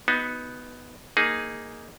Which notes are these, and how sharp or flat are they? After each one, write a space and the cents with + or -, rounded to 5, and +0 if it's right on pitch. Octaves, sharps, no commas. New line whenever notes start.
B3 +0 D#4 +15 F#4 +0
A#3 +0 D#4 +0 G#4 +0